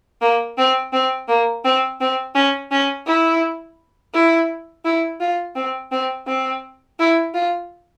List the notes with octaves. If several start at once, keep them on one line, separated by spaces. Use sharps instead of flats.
A#3
C4
C4
A#3
C4
C4
C#4
C#4
E4
E4
E4
F4
C4
C4
C4
E4
F4